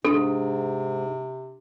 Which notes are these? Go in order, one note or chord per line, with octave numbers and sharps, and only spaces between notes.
G#2 C3 D4 A4